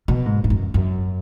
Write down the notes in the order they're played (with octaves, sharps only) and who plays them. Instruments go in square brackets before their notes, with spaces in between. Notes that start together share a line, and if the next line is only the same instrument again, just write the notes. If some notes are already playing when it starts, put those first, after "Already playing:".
[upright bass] B2
G#2
G#2
F#2
F#2